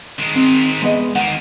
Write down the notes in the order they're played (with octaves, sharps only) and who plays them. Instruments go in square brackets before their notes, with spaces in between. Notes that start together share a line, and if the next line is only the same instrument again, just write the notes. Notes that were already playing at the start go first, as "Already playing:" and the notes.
[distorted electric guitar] D#3 G#3
[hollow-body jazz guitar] C4
G#3 B3 D#5
[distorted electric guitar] D#3 A#3 [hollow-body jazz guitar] F#5